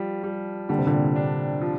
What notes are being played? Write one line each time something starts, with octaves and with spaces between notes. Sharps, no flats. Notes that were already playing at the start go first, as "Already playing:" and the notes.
Already playing: F3 G3
G3
D3 G3
C3
A#2 D3
D4
F3